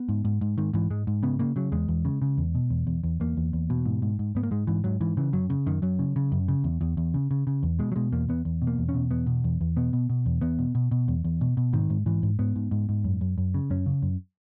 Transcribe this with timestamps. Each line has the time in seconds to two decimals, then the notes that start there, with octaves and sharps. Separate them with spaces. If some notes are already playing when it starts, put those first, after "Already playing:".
Already playing: B3
0.09 G#2
0.25 G#2
0.41 G#2
0.58 G#2 D#3
0.73 G#2 E3
0.90 G#2 G#3
1.07 G#2
1.23 C#3 B3
1.39 C#3 A#3
1.56 C#3 F#3
1.72 E2 G#3
1.88 E2
2.05 C#3
2.22 C#3
2.38 E2
2.55 B2
2.70 E2
2.87 E2
3.04 E2
3.20 E2 A#3
3.37 E2
3.53 E2
3.70 B2
3.86 G#2
4.02 G#2
4.19 G#2
4.35 G#2 B3
4.43 A#3
4.51 G#2 G#3
4.67 G#2 E3
4.84 G#2 F#3
5.01 G#2 E3
5.17 C#3 E3
5.33 F#2 F#3
5.50 C#3
5.66 F#2 D#3
5.82 F#2 F#3
5.99 C#3
6.16 C#3
6.32 F#2
6.48 C#3
6.64 E2
6.81 E2
6.97 E2
7.14 C#3
7.31 C#3
7.47 C#3
7.63 E2
7.79 B2 G#3
7.92 F#3
7.96 B2 G#3
8.12 E2 A#3
8.29 E2 B3
8.45 E2
8.62 B2
8.67 A#3
8.79 E2
8.89 C#4
8.94 B2
9.11 E2 B3
9.27 B2
9.44 E2
9.61 E2
9.77 B2 B3
9.93 B2
10.10 B2
10.26 E2
10.41 E2 B3
10.59 B2
10.75 B2
10.91 B2
11.08 E2
11.24 E2
11.41 B2
11.57 B2
11.73 G#2 D#3
11.90 G#2
12.06 G#2 E3
12.23 G#2
12.39 G#2 B3
12.56 G#2
12.71 G#2
12.89 G#2
13.05 F#2
13.21 F#2
13.38 F#2
13.54 C#3
13.70 F#2 C#4
13.86 C#3
14.02 F#2